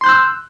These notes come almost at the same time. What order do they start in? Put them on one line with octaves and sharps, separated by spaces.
C6 G6 F#6 E6